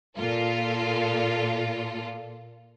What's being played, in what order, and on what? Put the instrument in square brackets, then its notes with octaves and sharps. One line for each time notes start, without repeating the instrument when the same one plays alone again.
[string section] A#2 F4 A4